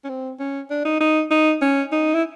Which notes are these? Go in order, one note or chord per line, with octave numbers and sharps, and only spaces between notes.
C#4
C4
C#4
D4
D#4
D#4
D#4
C#4
D#4
E4